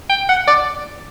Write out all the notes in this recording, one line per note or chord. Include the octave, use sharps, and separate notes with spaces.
G5
F#5
D5